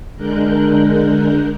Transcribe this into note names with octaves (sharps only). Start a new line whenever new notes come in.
D3 G#3 D4 A#4 F#6 G6